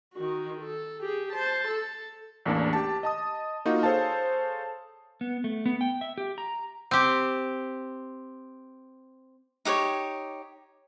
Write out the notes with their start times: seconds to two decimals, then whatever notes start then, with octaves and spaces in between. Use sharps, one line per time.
0.13 D#3 F#4
0.61 A4
1.00 G4 G#4
1.33 C5 A5
1.68 A4
2.45 A1 E2 A#3 D4 D5
2.73 G4 A5
3.03 D#5 A5 D#6
3.65 A#3 D#4 F4 F#4
3.83 G#4 A4 C5 C#5 F5 A5
5.21 B3
5.44 A3
5.66 B3
5.81 G5
6.01 E5
6.18 G4
6.38 A#5
6.91 C4 G4
9.65 D#4 G4 B4 C#5